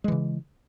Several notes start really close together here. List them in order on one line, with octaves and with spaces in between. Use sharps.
G#3 E3 C#3